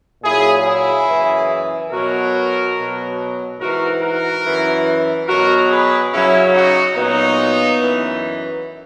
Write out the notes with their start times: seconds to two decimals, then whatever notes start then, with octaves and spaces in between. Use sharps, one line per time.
0.23 A#2 F#3 E4 G#4
0.66 E4 G#4
1.07 F#2 C#3 E3
1.91 B2 F#3 F#4 A#4
2.77 B2 F#3
3.59 G#2 E3 F#4 A#4
4.02 F#4 A#4
4.44 F#2 E3
5.28 B2 F#3 F#4 A#4
5.70 G#4 B4
6.12 F#2 C#3 F#3 C#4 E4
6.54 D#4 F#4
6.96 A#2 F#3 B3 D#4
7.81 F#2 E3